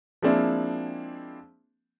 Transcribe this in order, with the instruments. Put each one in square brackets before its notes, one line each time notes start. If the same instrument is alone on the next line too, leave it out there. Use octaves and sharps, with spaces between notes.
[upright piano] F3 G#3 A#3 C4 D4 E4